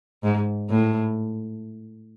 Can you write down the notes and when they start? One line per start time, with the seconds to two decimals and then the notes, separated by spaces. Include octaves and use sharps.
0.24 G#2
0.70 A2